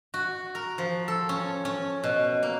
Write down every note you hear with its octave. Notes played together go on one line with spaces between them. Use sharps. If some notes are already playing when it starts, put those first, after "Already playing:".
F#4
A#4
F3
A4
C#4
C#4
B2
A#3